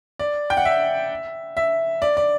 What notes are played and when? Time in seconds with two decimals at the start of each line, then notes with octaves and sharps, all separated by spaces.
0.19 D5
0.50 G5
0.57 F#5
0.65 E5
1.57 E5
2.02 D5
2.17 D5